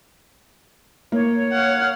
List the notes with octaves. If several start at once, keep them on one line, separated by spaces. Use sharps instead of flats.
A#3 C#5
F5 F#5